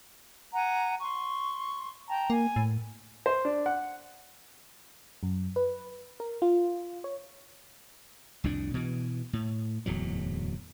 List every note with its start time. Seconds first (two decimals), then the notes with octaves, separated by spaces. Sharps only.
0.54 F#5 G#5 A#5
1.01 C6 C#6
2.09 G5 A5 A#5
2.30 A#3 G#5
2.56 A2
3.26 C5
3.45 D4
3.66 F#5
5.23 F#2
5.56 B4
6.20 A#4
6.42 F4
7.04 C#5
8.44 C2 F2 A2 D4
8.74 B2 E3
9.33 A2
9.86 D1 E2 G#2 F#3